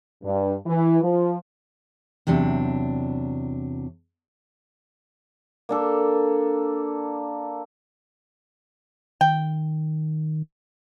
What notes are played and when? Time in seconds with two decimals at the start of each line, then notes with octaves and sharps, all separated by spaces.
0.24 G2
0.67 E3
1.02 F3
2.27 E2 C3 F#3 D4
5.69 A#3 D4 A4
9.21 D#3 G5